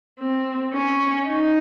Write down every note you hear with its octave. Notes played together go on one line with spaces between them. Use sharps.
C4
C#4
D#4